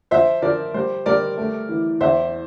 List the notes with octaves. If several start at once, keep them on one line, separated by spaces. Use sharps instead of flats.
F3 C5 E5
F3 A#4 D5
G3 C5
G3 A#4 D5
A3
E3
E2 C5 E5